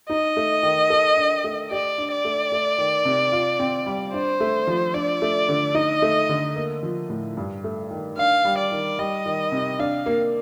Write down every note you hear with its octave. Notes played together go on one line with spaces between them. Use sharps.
D#4 D#5
A3
D#3
A4
D4
A3
G4 D5
D4
D5
A3
A3
D#3
C3
F4
C4
G3
D4 C5
A3
F3
D4 D5
A3
D3
D#4 D#5
A3
D3
A#3
F3
A2
G2
A3
D#3
D4 F5
G3
D5
D#3
G3 D#5
D#3
C3
D4 F5
A#3